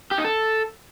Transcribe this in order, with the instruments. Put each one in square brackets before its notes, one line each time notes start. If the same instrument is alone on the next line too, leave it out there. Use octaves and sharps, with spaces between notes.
[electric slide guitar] G4
D#4
A4